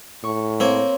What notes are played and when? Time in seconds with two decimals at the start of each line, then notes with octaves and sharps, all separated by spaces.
0.24 A2 C#6
0.60 A#3 C4 A#4 C#5 C6